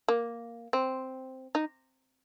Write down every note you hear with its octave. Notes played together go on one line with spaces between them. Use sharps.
A#3
C4
D#4